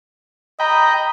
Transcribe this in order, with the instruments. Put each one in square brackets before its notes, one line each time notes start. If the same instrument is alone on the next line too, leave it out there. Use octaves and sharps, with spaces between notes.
[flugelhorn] D#5 [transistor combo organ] G5 B5 [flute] A#5